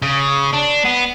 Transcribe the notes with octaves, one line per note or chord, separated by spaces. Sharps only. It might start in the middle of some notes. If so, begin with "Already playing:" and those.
C#3
D4
B3